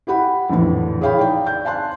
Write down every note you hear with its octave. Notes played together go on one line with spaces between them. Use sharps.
E4 G4 F#5 B5
A#1 F2 A2 D3 E3
G#4 C#5 F5 G5 B5
D#4 D5 G5
G6
F5 G#5 A5 C6 F#6